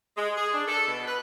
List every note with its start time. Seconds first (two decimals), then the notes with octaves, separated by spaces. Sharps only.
0.17 G#3
0.37 G#4
0.54 D4
0.68 A4
0.87 B2
1.07 B4